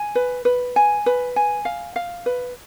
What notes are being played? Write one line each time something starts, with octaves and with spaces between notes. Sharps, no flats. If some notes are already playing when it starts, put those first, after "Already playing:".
Already playing: G#5
B4
B4
G#5
B4
G#5
F5
F5
B4